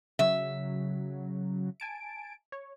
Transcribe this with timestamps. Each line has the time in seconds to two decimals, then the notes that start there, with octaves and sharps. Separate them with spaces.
0.19 C#3 F#3 E5
1.80 G#5 A5 D7
2.52 C#5